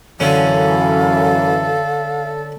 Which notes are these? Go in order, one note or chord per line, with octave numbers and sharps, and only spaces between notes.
F#2 D3 E3 C#4 A4 F5